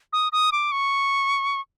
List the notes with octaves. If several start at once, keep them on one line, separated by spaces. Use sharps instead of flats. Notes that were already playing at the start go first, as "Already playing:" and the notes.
D#6
D#6
D6
C#6